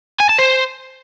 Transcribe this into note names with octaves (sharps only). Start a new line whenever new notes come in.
G#5
A5
C5